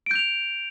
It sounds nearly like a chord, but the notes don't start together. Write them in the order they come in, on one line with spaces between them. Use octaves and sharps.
D7 G6 F7